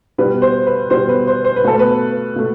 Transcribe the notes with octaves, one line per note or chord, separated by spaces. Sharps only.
B2 G3 B4
C5
B4
B2 G3 C5
B4
C5
C5
B4
B2 A3 A4
B4
B2 A3